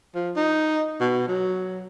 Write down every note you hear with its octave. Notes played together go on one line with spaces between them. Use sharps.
F3
D#4
B2
F#3